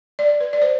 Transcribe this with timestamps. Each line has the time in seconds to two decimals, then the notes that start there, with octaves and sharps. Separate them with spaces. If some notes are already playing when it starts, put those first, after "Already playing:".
0.19 D5
0.40 B4
0.53 D5
0.62 C5